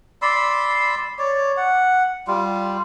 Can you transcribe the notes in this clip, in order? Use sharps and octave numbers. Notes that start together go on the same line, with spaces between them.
D5 B5 C6 E6
C#5 D5
F#5
G3 F4